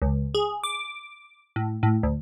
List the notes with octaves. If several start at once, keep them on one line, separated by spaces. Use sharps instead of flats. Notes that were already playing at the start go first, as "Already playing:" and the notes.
C#2
G#4
D6
A2
A2
D2